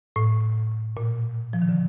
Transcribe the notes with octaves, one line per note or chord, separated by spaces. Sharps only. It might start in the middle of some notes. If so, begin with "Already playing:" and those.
A2
A#2
F3
D#3
D3